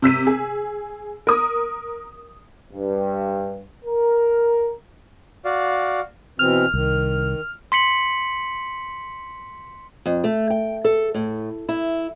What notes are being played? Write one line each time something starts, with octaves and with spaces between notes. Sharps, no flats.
C3 E6 B6 D#7
G#4
A#4 D#6
G2
A#4
F#4 D5 F5
B2 E3 C4 F6
C2 D#3
C6 B6 C#7 F#7
F2
A3
G5
A4
A2
E4